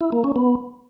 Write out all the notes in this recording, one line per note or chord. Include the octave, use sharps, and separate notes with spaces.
E4
A#3
C#4
B3